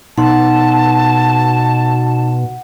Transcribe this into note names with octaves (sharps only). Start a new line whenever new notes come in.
B2 D#4 F#5 A5 C6